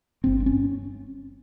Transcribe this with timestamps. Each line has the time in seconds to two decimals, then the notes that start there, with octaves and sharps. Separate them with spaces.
0.24 G1 G2 C4
0.40 C4
0.46 C#4